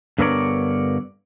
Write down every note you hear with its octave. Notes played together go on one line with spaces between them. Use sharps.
G2 D3 B3 A#4 C#5 D5